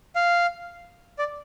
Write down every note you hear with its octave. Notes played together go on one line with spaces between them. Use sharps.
F5
D5